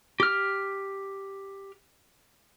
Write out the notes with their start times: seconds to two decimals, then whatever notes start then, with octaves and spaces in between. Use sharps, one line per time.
0.20 G4 F6